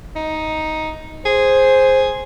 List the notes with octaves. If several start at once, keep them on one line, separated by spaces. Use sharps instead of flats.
D#4
G#4 C5